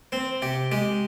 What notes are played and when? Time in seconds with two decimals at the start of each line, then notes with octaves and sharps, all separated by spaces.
0.12 C4 C5
0.42 C3 G4
0.72 G#3 G4